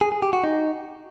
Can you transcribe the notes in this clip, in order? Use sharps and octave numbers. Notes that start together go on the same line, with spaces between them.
G#4
G#4
G4
F#4
D#4